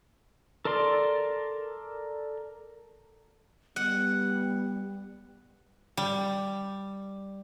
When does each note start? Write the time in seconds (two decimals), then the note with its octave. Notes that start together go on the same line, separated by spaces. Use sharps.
0.65 A4 A#4 D5 C6
3.76 G3 B3 F#5
5.97 G3